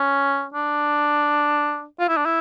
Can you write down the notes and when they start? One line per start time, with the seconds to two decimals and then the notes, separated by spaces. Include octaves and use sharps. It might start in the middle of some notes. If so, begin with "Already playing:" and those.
Already playing: C#4
0.54 D4
2.00 F4
2.08 E4
2.17 D4
2.26 E4